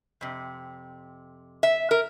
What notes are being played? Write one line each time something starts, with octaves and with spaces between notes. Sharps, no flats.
F2 C3
E5
A#4